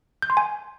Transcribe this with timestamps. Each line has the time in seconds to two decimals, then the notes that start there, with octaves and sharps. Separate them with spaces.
0.22 G6
0.30 C6
0.37 G#5